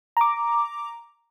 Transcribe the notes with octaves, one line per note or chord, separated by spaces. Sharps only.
A#5 D6